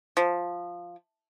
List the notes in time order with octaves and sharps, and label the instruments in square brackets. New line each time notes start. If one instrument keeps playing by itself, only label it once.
[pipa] F3